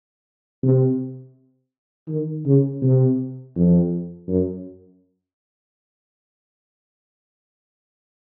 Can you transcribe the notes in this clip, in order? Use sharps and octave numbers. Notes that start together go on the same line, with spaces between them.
C3
D#3
C#3
C3
F2
F#2